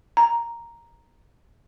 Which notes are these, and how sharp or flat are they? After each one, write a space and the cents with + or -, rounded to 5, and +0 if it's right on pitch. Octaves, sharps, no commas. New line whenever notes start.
A#5 +0